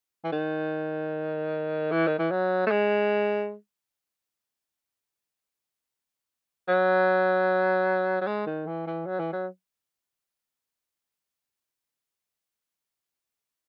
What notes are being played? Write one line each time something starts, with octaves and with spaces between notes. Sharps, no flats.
E3
D#3
E3
D#3
E3
F#3
A3
G#3
F#3
F#3
G#3
D#3
E3
E3
F#3
E3
F#3